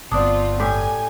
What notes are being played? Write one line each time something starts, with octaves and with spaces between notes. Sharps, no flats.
G1 B3 C4 D4 F4 D5 D#6
A2 G4 G#5